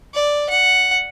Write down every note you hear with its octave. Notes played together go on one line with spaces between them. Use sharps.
D5
F#5